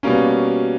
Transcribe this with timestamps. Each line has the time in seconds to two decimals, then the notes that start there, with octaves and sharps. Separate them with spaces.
0.03 B2 G3 A#3 C#4